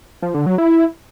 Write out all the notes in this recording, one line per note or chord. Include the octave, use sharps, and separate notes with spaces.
F3
D3
F#3
E4